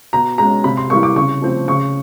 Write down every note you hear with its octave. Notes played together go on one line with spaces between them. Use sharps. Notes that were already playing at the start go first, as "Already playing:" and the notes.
B2 A#5
G#3 C#4 A#5
C3 B5
C6
E3 G3 A#3 C#6
D6
C#3 C#6
F3 A3 C4
C#3 C#6